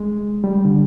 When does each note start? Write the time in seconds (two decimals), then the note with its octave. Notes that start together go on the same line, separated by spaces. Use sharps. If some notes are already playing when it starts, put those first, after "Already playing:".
Already playing: G#3
0.44 G3
0.65 D3